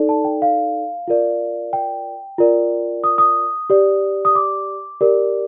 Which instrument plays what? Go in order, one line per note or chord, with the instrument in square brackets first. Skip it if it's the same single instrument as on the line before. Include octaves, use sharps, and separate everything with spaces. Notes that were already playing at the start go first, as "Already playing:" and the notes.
Already playing: [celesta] D#4 A4 D5
A5
G5
F5
F4 A#4 D5
G5
F4 A#4 D5
D#6
D#6
G4 D5
D#6
D6
G4 A#4 D5